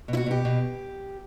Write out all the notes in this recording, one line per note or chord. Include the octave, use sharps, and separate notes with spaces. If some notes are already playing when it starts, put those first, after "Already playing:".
B2
E4
F#4
B2 G4
B2